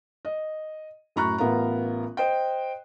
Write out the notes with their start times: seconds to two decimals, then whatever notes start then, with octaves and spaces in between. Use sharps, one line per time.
0.25 D#5
1.16 F#2 A2 A#5 B5 C#6 F#6
1.38 A1 B3 F4 A#4 A#5
2.17 C5 D#5 G5